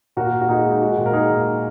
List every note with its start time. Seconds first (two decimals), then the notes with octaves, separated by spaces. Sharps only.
0.17 A#2 F#4 A#4
0.33 A#2
0.41 F#4
0.48 A#2 D#4 G#4
0.65 G#3
0.72 D#4
0.81 G#3 F#4
0.98 A#2
1.06 A#4
1.13 G#3 D#4 G#4
1.30 A#2